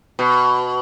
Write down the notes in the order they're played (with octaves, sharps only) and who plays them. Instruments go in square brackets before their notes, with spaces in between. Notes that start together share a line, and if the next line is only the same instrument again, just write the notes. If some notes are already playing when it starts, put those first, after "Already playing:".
[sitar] B2